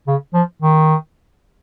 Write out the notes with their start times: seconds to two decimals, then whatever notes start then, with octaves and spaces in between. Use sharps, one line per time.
0.07 C#3
0.34 F3
0.62 D#3